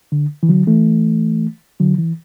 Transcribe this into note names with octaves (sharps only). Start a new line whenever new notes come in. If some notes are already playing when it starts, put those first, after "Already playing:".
D3
E3
D3 F#3
E3 A3
D3 F#3
E3